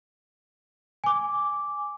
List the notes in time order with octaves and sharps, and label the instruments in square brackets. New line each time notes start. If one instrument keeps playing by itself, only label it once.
[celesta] G#5 D6